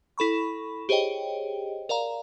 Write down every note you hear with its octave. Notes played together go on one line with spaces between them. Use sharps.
E4 A4 B5 C#6
G4 G#4 C5 C#5 D#5 G5
A#4 D5 F5 A#5